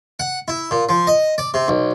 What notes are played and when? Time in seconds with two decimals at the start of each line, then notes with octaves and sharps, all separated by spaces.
0.20 F#5
0.48 E4
0.71 A#2
0.89 F3
1.07 D#5
1.38 D5
1.54 C3
1.68 B1